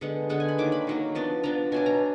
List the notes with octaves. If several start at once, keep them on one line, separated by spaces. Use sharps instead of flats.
D3 G#3 B3 F#5
D3 G#3 B3 F#5
G#5
B5
D#3 F#3 A#3 D6
B5
D#3 F#3 A#3
F3 B3 D4
F3 B3 D4 A#5
B2 F#3 D4 G#5
A#5